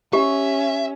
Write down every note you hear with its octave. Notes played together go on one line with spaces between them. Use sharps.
C#4 G4 E5